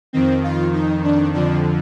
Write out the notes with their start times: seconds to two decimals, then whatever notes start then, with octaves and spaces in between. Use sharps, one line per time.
0.13 F2 D#3 C4
0.44 F4
0.73 D#4
1.04 D4
1.34 F2 D3 F3 D4